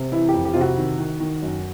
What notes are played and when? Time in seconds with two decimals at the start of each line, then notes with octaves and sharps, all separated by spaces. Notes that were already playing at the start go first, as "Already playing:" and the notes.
Already playing: C3
0.12 E3 E4
0.29 G4
0.34 F2
0.45 G4
0.54 C3 F4
0.61 F#4
0.77 D#3
0.99 D#3
1.20 D#3
1.42 F#2